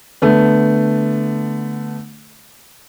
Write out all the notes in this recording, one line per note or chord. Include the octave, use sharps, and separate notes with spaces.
D3 A3 B3